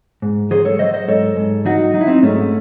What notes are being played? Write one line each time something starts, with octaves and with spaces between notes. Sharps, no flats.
G#2
F#3 G#4 C5
A4 C#5
F#3 C5 D#5
C5 D#5
G#2 A4 C#5
G#2
F#3 D#4 F#4
F#3 D#4
E4
C4 D#4
G#2 A3 C#4